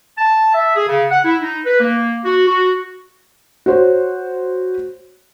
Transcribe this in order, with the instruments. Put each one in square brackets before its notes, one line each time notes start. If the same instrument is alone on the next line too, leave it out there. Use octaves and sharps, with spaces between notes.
[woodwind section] A5
E5
G#4
C#3
F#5
E4
D#4
B4
A#3
F#4
F#4
[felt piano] F#4 C5 C#5